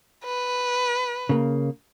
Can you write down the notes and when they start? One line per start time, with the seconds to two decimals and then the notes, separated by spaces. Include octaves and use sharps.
0.25 B4
1.29 C#3 A#3